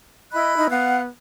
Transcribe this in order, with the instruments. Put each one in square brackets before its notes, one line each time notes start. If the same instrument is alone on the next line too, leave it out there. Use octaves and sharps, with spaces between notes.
[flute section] E4 B5 F#6 [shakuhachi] D#5
[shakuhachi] D#4
[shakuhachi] B3 [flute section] F5 F#5